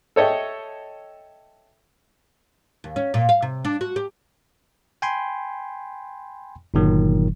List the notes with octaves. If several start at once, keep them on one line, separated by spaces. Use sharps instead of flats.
A4 C#5 D#5 E5 G5
D#2
C#4
A#2
F5
C3
D4
F#4
G4
G5 G#5 B5 C6
G1 A#2 D#3 F#3